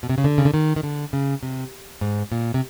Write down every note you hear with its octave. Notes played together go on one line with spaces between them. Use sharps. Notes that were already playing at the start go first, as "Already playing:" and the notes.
B2
C3
C#3
D3
C#3
D3
D#3
D#3
D3
C#3
C3
G#2
A#2
C3